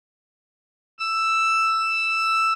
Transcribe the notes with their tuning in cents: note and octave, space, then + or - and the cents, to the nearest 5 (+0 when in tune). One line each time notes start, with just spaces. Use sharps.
E6 +5